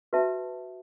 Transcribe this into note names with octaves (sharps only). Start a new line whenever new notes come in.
F#4 B4 E5 A5